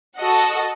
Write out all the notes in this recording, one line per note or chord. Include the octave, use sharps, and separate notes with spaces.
F#4 A4 D#5 F#5